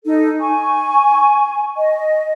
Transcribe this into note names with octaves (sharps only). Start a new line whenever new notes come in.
D#4 A4
G#5 C#6
D#5